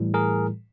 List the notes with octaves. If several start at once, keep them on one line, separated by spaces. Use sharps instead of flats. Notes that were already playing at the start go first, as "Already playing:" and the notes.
Already playing: A2 E3 G3
G#4 A#4